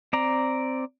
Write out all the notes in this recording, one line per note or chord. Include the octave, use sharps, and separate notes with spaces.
C4 D5 A#5